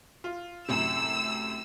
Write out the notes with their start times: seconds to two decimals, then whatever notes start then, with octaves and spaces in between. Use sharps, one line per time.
0.24 F4
0.68 F#2 A2 C3 E6